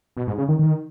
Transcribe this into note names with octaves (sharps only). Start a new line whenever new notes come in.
B2
G#2
C#3
D#3
D#3